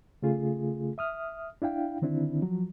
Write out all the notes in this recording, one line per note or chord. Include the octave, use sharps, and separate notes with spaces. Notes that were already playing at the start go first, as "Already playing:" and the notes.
C#3 A3 F4 G#4
E5 D#6 F6
D4 E4 F5 G5
D3 D#3 C4 D4 E4
F3 F#3